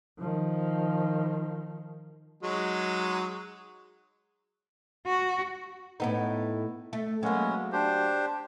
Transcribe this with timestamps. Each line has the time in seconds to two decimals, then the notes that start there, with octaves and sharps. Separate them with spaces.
0.19 D#3 F3
2.43 F#3 G#3 D#4
5.06 F#4
6.00 A2 B3 D#4
6.93 A3
7.23 F#3 G#3 A#3 B3 C#4
7.72 D4 G4 C5